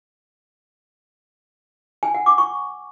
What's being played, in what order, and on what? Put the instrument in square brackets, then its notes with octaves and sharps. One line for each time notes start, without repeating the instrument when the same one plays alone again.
[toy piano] G#5
F#5
D6
C#6